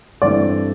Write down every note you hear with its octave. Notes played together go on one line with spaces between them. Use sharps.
G2 E3 A3 C4 D5